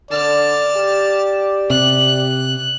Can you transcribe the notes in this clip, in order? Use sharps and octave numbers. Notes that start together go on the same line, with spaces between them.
D3 D5 A5 F6
G4
C3 F#6